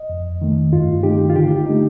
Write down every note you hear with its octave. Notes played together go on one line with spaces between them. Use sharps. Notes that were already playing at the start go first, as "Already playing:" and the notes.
Already playing: D#5
F2
D#3 A3
G2 F4
D#3 A3 D#4 G4
F4
D3 G4
A3 D#4